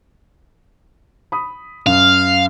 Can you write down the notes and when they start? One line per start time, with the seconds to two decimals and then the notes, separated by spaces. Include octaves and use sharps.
1.32 B5 D#6
1.87 F#2 F5